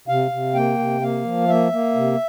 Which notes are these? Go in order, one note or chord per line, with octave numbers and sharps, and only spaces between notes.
C3 F5
C3
A#3 G5
C3
A#3 F5
F3
A#3 E5
A#3
C3